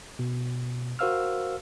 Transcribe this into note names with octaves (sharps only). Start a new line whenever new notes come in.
B2
F#4 A#4 C5 F5 E6 F6